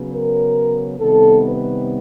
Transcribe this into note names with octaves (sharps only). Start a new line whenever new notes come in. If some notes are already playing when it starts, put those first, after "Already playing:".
Already playing: C#3 F#3 B3
A#4
C3 D#3 G3 B3 A4
B4